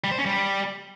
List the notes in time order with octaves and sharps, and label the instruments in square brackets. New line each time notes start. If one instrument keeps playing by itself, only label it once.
[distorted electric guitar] G3
C5
C#4
G3